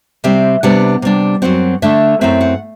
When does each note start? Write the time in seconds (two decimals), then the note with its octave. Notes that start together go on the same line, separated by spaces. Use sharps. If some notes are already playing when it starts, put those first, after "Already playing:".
0.24 C3 G3 C4 E5
0.63 C3 G3 B3 D4 F#5
1.02 C3 G3 D4
1.42 F#2 F#3 C4 F#5
1.82 D3 A3 D4 E5
2.21 F#2 F#3 A3 C4 E4 E5
2.41 F#5